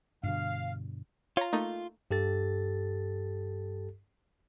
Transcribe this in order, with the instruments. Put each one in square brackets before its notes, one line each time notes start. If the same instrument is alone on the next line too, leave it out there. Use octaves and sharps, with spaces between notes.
[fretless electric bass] G2 B2 D3 [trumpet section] F5
[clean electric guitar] F4 [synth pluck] C#5 A#5
[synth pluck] A3 A#3 D#4
[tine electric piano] G2 G4 A4 A6